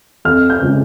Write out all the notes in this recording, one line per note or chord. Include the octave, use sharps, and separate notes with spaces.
F2 F6
G6
C#3 F3 G#3